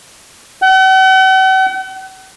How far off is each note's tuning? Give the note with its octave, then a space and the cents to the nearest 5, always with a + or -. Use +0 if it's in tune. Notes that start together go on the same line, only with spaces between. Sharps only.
F#5 +45